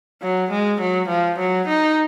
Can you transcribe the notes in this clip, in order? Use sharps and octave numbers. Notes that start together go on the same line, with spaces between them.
F#3
G#3
F#3
F3
F#3
D#4